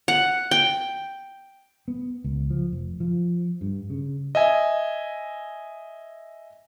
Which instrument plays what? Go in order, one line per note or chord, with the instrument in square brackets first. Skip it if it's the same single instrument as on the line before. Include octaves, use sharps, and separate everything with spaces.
[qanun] F#5
G5
[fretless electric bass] B3
C#2
F3
F1
F3
G2
C#3
[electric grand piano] D#5 E5 G#5